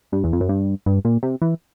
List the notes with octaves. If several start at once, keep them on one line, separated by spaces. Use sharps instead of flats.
G2
E2
F2
F#2
G2
G2
A#2
C3
E3